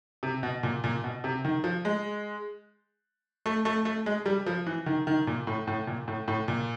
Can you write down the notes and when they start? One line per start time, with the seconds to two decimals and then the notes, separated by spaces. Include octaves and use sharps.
0.23 C3
0.43 B2
0.63 A#2
0.84 A#2
1.04 B2
1.24 C3
1.45 D#3
1.64 F3
1.85 G#3
3.46 A3
3.65 A3
3.85 A3
4.06 G#3
4.26 G3
4.47 F3
4.67 E3
4.86 D#3
5.07 D#3
5.27 A#2
5.47 A2
5.67 A2
5.87 A#2
6.08 A2
6.28 A2
6.48 A#2